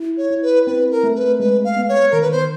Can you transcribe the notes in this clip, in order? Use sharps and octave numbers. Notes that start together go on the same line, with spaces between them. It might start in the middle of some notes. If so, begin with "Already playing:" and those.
Already playing: E4
C#5
E4
B4
C4 B4
A#4
A3
B4
G#3 B4
F5
B3
C#5
D#3 A#4
B4
C5